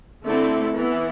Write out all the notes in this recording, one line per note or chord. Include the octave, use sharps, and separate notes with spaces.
D3 A3 C4 E4 A4
E3 B3 E4